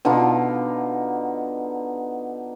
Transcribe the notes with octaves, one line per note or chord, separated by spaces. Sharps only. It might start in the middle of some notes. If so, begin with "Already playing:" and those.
B2 D3 D#4 F4